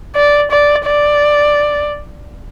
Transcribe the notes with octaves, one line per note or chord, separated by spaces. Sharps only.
D5
D5
D5